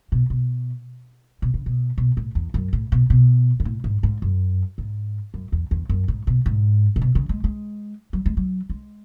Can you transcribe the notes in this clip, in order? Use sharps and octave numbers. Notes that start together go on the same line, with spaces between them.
B2
B2
B2
C#3
B2
B2
A2
E2
F#2
A2
B2
B2
B2
A2
G#2
G#2
F#2
G#2
F#2
E2
E2
F#2
G#2
B2
G#2
A2
B2
C#3
G#3
G#3
F#3
G#3
F#3
G#3